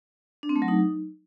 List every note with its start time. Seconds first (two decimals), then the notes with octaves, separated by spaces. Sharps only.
0.43 D4
0.49 C4
0.56 A3
0.62 F#3
0.68 D#4